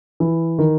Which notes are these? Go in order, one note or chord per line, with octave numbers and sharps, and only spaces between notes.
E3
D#3